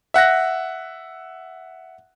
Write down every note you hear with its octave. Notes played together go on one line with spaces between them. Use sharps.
E5 F#5 F#6 A#6